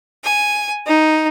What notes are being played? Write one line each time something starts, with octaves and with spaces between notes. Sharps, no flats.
G#5
D#4